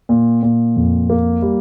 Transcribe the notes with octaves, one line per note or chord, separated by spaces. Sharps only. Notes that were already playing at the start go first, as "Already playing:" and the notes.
A#2
A#2
F2
A#3
G3